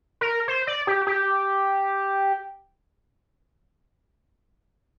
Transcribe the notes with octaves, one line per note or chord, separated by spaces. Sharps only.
A#4
C5
D5
G4
G4